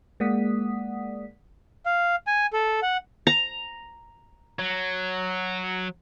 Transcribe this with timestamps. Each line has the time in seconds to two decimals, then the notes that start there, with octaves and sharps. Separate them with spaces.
0.20 G#3 A#3 D5 F#5 D#6 B6
1.86 F5
2.27 G#5
2.53 A4
2.82 F#5
3.27 A#5
4.59 F#3